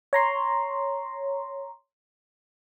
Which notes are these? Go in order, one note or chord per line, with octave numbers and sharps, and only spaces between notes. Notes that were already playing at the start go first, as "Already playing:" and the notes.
C#5 A#5 C6